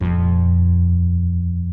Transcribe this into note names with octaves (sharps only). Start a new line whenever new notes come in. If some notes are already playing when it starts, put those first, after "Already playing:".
D#1 F2